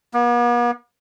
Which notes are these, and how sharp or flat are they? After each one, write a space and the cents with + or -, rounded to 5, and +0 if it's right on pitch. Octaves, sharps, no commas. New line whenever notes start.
B3 -45